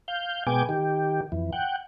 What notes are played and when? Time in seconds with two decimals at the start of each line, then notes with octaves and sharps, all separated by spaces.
0.08 F5 G6
0.47 B2 G#3 B3 G5 G#5 D6
0.69 D#3 G4
1.32 F2 E3
1.53 F#5 G5